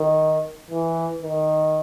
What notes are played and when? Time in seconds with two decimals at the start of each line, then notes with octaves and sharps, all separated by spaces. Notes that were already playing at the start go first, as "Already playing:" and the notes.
Already playing: D#3
0.71 E3
1.23 D#3